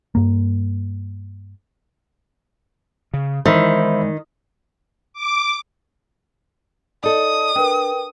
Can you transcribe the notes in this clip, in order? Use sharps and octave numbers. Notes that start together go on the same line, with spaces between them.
G2 A#3
C#3
D#3 E3 G#3 C5 E5 B5
D6
D#4 A4 D5 D#5 D#6
D4 A#4 B4 G5